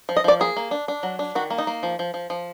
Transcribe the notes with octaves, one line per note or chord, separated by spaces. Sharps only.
F3
D#5
F3 D5
A#3 G#4
A#3
D4
D4
F#3
D4
D#3 F#4
A#3
D#4
A#3
F3
F3
F3
F3